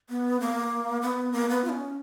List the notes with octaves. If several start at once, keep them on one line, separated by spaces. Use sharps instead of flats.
B3
A#3
B3
A#3
B3
F4
C#4